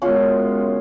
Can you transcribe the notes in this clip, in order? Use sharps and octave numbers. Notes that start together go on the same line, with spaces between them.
F#2 C#3 G#3 B3 C#4 F4